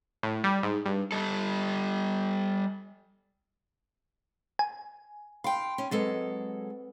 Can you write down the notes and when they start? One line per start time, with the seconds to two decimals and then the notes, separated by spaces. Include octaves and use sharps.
0.23 A2
0.44 G3
0.63 G#2
0.85 G2
1.12 G3 A4
4.59 G#5
5.44 F5 G5 B5 C6 D7
5.78 C#4
5.91 F#3 G#3 C4 A4 B4